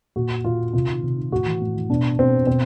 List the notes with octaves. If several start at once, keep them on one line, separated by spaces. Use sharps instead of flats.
A#2 F#4
A#2 F4
C3 F4
D#3
C3
D#3
A2 F#4
E3
A2
E3
B2 D4
B2 C4
B2 C4